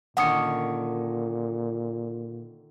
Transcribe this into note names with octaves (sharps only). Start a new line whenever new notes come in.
A#2 D3 D#3 C#4 F#5 D#6 C#7